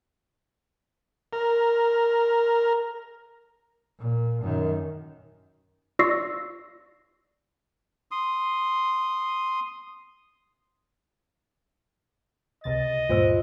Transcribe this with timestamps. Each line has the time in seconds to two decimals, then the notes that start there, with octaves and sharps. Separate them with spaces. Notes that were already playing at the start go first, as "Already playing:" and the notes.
1.33 A#4
3.99 A#2
4.43 F#2 D#3
5.99 F4 D5 C#6 E6 A#6 C7
8.11 C6 D#6
12.64 C#2 C3 D#5 A6
13.09 D2 G2 A#2 F4 C5 E6